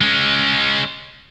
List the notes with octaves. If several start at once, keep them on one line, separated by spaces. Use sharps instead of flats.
G#3 C#4